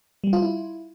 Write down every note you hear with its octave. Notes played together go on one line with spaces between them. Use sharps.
G3
F4
E4